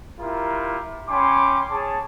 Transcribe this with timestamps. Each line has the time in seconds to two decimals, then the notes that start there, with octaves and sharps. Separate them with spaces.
0.20 E4 F4 G4 A#4
1.09 C#4 G5 B5 C6 D6
1.70 G#4 C#5 A5